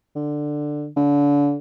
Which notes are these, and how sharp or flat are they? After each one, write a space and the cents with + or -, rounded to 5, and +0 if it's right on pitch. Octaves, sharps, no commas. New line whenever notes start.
D3 +10
D3 -35